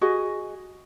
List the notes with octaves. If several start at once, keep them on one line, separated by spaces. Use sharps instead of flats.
F#4 G#4 D#5